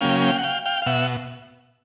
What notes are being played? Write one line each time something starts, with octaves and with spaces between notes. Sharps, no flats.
C#3 F#3 A#3 C#4 F5 G5
F5 G5
F#5
F5 G5
F5 G5
F5
B2 E5 F#5